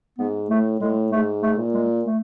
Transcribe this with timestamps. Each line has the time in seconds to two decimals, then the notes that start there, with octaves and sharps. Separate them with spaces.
0.19 G#2 B3
0.50 A2 A3
0.80 A2 G#3
1.11 G#2 A3
1.42 A3
1.58 A#2
1.74 G#3
2.05 A3